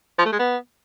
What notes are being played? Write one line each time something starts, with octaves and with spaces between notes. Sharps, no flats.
F3
A3
G#3
B3